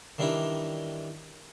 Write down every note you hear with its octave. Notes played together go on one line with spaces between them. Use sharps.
D#3 E3 G3 D4 E4 A#4